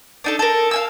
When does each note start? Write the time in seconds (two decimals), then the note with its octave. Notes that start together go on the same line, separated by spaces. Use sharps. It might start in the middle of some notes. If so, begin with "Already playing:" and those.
0.24 D4 D#4 A4
0.39 A4 A#4
0.71 F5 G#5 E6